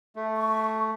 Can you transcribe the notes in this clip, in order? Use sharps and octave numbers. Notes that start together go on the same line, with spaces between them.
A3
C#6